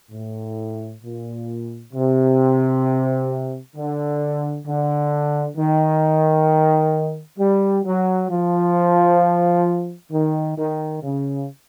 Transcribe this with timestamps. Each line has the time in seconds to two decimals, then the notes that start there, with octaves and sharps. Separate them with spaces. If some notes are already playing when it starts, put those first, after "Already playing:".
0.12 A2
1.03 A#2
1.93 C3
3.76 D3
4.66 D3
5.56 D#3
7.38 G3
7.84 F#3
8.30 F3
10.12 D#3
10.58 D#3
11.03 C#3